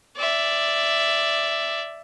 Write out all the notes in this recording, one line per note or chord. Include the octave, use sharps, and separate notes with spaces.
D5 E5